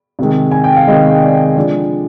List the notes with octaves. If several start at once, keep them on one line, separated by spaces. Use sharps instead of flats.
C3 D#3 G#3
G#5
G5
F5
C3 D#3 G#3 D#5
D5
D3 F3 G#3 D5